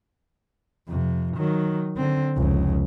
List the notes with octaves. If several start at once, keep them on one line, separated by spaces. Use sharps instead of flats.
F2 C3
D#3 F#3
D3 C4
F1 C#2